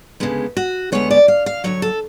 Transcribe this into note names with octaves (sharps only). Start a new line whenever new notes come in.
D2 C#3 G#3 B3
F#4
D2 C#3 G#3 B3 C#5
D5
F5
F5
D2 C#3 F#3 C#5
A4